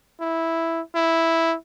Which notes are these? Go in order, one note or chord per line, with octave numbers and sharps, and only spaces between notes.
E4
E4